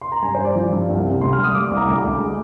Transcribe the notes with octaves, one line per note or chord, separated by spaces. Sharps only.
C6
A#5
G2 G#5
G3 C5
D5
F3
G2
C2
C3
D2 C6
F6
G3
D#6
G3 D6
D#6
C2
A#5
D2 D6
D2
G#3